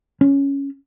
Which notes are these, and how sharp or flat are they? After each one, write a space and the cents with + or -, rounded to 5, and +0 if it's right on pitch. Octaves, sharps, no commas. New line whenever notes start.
C#4 +5